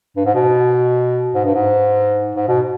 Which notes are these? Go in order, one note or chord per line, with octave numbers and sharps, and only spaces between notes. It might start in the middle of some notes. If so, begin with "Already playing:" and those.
G2
G#2
B2
G#2
G2
G#2
G#2
B2